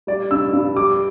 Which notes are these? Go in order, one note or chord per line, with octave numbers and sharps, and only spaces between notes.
G3 D5
G2 E6
G2
G3 D6